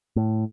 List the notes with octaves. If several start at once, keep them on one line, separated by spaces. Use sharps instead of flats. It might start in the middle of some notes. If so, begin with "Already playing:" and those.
A2